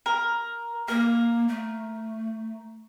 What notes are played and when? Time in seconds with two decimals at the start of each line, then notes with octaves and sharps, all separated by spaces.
0.06 A#4
0.88 A#3 A#4
1.48 A3